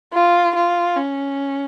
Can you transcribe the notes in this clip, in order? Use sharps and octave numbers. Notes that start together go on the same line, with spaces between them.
F4
F4
C#4